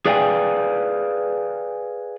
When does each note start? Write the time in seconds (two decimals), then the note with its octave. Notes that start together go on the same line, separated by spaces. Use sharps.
0.06 G#4 B4 D5 F5 G5 G#5